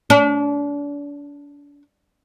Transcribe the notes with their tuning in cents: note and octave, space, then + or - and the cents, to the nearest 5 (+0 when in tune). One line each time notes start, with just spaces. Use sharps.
D4 -35